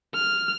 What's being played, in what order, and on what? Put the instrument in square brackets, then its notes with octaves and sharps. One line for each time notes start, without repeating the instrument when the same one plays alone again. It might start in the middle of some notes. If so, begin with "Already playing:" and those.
[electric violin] F6